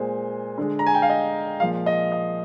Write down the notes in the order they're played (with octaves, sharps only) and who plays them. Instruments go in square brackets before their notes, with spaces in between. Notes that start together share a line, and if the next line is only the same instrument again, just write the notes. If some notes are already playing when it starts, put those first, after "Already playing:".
Already playing: [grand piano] A#2 G#3 C5
D3 G#3
A#5
G#5
G5
F5
D#5
A#2 F3 G#3 F5
D#5
D#5